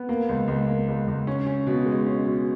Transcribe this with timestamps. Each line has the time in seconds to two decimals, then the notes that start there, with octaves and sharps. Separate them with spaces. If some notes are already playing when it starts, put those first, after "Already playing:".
Already playing: B3
0.09 A#3
0.29 C#2
0.48 C#2
0.68 A#3
0.88 C#2
1.08 C#2
1.27 C#4
1.46 C#4
1.67 B2
1.86 G#3
2.06 C#4
2.26 B2